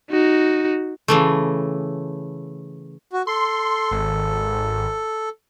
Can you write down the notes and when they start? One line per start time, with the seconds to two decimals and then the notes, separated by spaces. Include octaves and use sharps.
0.10 D#4 F#4
1.08 C#3 E3 A3
3.13 F#4
3.27 A4 C6
3.91 G#1